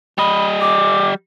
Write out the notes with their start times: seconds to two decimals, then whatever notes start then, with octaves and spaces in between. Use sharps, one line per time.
0.18 G3 D#5 B5
0.61 D6